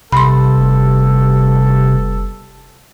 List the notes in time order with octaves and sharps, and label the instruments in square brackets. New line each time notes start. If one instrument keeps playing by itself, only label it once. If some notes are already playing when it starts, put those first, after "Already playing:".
[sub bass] A1 [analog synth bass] C3 [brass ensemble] G3 B3 A4 [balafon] B5 C6
[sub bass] F1